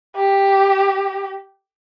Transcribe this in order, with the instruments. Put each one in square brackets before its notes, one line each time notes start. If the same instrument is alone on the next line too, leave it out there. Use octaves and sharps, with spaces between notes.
[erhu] G4